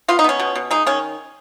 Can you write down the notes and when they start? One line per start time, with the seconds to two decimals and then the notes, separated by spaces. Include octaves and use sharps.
0.08 B3 F4
0.19 D#4
0.24 B3 C#4
0.40 B2
0.55 B2
0.71 G#3 D#4
0.87 D#3 C#4